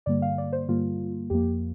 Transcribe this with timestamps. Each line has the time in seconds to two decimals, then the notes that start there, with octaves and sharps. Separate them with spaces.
0.06 G2 D3 G3 A#3 D5
0.22 F5
0.38 D5
0.53 C5
0.68 G2 D3 G3 A#3 F4
1.30 F2 F3 A#3 G4